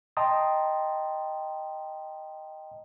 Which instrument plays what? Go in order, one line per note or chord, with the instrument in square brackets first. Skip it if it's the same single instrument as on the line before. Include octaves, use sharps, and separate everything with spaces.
[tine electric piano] D#5 G5 A5 A#5 C6 D#6